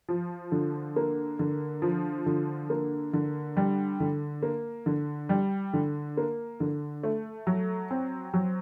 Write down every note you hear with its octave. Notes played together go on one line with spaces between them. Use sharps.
F3
D3
A#3
D3
F3
D3
A#3
D3
G3
D3
A#3
D3
G3
D3
A#3
D3
A3
F#3
C4
F#3